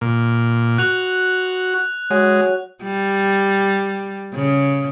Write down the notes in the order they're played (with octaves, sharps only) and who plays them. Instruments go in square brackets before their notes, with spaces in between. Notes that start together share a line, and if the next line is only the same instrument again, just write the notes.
[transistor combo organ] A#2
[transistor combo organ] F#4 [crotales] F#6 F7
[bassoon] F#3 [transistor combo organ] G#3
[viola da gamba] G3
C#3